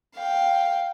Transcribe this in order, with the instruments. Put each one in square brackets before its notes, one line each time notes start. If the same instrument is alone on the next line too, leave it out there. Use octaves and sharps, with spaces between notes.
[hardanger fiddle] F5 G5